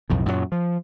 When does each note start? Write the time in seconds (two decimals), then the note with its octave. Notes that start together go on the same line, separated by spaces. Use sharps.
0.10 B1 F2 A2
0.26 F#2 A#2 C#3 F#3
0.52 F3